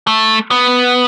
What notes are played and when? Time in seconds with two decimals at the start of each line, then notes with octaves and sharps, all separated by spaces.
0.07 A3
0.51 B3